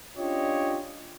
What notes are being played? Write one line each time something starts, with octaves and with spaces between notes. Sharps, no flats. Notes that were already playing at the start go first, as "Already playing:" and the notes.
C#4 D4 F4 G4 C#5 D#5